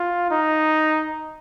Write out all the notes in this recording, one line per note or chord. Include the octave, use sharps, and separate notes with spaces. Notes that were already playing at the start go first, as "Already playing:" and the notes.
Already playing: F4
D#4